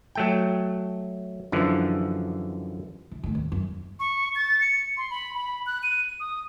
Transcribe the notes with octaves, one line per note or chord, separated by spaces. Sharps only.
F#3 A3 G5
F#2 D3 E3 F3
E3
A2 D#3
D#2
F#2
C#6
A6
C#7
C6
B5
B5
F#6
D#7
D#6